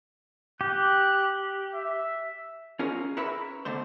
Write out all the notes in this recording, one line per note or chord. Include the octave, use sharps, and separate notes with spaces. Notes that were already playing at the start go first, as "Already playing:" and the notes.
G4 F#6
E5
C#4 F4 G#4 A#4 C#5
A#4 B4 C#5 E5 B5
B2 D3 A3 C5